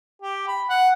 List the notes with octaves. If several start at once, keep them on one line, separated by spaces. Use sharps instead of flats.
G4
B5
F#5